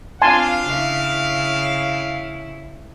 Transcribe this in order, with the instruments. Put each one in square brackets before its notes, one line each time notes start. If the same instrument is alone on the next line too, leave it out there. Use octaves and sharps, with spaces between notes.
[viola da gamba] C4 D4 F4 [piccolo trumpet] F5 [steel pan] G#5 A5 C6
[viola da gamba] C#3 E4